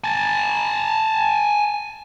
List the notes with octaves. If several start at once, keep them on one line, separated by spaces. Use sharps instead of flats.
G#5 A5